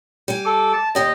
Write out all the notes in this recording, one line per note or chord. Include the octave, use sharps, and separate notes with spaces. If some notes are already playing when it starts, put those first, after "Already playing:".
G3 G#5
A4 D6
A5
D#2 G4 D5 D#5